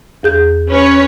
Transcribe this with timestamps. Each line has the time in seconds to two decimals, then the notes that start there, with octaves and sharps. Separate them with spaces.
0.23 E2 G#4 G6
0.68 C#4 B4 C#5